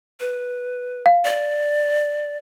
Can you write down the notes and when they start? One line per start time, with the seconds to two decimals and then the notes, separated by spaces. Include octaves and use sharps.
0.20 B4
1.06 F5
1.25 D5